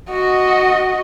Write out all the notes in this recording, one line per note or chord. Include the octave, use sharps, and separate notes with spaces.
F#4 D#5